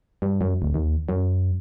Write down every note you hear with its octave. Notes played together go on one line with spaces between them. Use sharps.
G2
F#2
D1
D#2
F#2